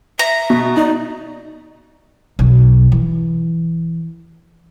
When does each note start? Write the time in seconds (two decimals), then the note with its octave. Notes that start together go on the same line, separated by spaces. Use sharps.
0.19 E5 A#5
0.50 B2
0.77 D#4 D5
2.39 B1
2.92 E3